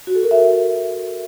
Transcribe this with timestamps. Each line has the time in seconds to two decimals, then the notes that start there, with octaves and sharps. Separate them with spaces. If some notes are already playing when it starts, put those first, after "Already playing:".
0.07 F#4
0.15 A4
0.23 A#4
0.31 E5